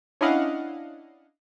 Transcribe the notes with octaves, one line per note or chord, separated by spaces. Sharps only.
C#4 D4 E4 D#5 F5 F#5